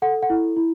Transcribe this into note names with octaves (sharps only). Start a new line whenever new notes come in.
A4 F#5
F#5
E4
E4